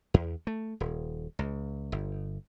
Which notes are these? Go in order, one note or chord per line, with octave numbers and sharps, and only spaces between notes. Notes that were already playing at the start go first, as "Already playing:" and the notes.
E2
A3
D#1
C#2
G1